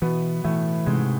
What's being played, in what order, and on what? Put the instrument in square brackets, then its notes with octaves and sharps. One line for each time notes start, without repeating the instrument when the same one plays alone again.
[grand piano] B2 B3 [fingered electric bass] E3
[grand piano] A2 A3 [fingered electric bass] E3
[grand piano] G#2 G#3 [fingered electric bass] C3